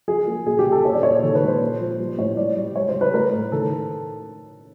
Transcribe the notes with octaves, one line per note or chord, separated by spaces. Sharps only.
F3 G#4
A#3
A#2 G#4
G4
A#2
A4
A#2 C#5
D5
A#2 C#5
D#3 A4
B4
G#3
C5
A#2
F3
G3
A2 C#5
G3 D5
G3
G#3 C#5
C5
G#3
B4
A3 A#4
A2
D#3 A4